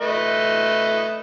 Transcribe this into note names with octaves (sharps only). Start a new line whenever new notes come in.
A3 B4 D#5